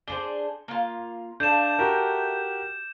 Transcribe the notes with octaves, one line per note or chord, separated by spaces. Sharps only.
D4 G#4 C5 G7
A#3 F4
A3 D4 F5 G6 E7
F#4 G4 A#4